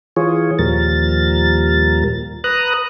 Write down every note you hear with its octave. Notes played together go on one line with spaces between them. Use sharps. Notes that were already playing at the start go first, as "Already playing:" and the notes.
E3 F4 G#4 C#5
D#2 A#2 F3 G3 A#4 A6
B4 A#5 D#6 F#6